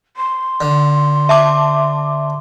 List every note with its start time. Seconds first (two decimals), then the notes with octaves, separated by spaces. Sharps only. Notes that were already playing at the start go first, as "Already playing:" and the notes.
0.17 C6
0.61 D3
1.29 E5 A5 D6